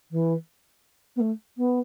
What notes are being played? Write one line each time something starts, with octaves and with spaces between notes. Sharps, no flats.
E3
B3
A3
B3